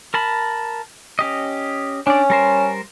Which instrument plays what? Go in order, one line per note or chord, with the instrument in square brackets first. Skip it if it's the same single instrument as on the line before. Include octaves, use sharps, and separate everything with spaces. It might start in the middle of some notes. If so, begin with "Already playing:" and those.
[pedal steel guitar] A#4 A5 B5
C#4 G4 D#5
[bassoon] C#4 [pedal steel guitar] D4 D5
[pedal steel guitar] G3 A#4 C5